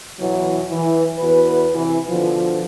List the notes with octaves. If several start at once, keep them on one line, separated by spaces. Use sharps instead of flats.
E2 B2 E3 F#3
E3
E2 F#4 B4
C3 E3
B2 D3 F3